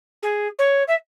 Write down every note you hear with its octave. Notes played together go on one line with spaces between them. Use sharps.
G#4
C#5
E5